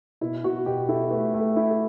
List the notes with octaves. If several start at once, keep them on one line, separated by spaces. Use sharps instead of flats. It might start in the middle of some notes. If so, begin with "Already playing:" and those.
B2 E4
B2 F#4
B2 G4
E4 A4
A3 B4
A3
A4
E4
A4